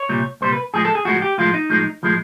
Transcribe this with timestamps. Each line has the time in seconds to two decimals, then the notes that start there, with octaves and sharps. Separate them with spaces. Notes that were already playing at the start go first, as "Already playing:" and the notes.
Already playing: C#5
0.09 C2 A#2 G3
0.41 C2 A#2 G3 C5
0.53 B4
0.74 A2 F3 G#3 G#4
0.85 A4
0.95 G#4
1.05 A2 F3 G#3 F#4
1.22 G4
1.38 A2 F3 G#3 F4
1.54 D#4
1.70 A2 F3 G#3
2.03 A2 F3 G#3